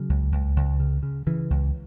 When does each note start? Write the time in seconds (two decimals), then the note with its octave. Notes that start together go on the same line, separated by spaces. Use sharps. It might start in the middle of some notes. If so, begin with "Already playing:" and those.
Already playing: C#3 F#3
0.09 C#2
0.32 C#2
0.56 C#2
0.80 C#3
1.03 C#3
1.27 C#3 E3
1.50 C#2